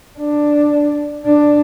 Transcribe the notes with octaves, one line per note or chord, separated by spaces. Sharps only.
D4
D4